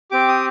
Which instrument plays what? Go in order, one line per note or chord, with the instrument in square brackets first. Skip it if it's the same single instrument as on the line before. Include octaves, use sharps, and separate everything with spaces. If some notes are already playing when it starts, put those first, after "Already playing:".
[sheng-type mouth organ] C4 G4 D6
D#6